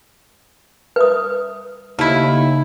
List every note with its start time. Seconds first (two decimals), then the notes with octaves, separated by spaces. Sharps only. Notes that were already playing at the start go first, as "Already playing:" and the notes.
0.96 B4 E5 D#6
1.99 D#2 C#3 A3 E4